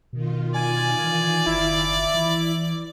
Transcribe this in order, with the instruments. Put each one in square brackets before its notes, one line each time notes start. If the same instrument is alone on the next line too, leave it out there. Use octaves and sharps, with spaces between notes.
[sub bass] B2 [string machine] D#3 F4
[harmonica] D5 [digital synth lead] G#5
[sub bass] E3
[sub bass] F#1 [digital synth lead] E4
[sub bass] E3